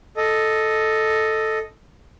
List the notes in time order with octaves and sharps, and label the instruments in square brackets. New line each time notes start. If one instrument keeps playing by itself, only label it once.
[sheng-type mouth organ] A4 D#5